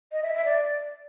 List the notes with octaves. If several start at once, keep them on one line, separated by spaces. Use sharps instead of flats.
D#5
E5
E5
D5